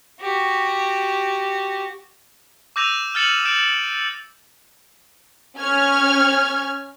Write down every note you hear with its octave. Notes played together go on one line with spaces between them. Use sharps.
F#4 G4
D6 E6 G6 A#6 D#7 F7
F6 G6 A6 C#7 E7 F#7
E6 G6 D7 E7
C#4 F6 G#6